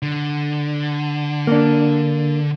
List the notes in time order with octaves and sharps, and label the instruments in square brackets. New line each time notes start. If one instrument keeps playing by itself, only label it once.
[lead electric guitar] D3
[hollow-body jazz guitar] A#3 D4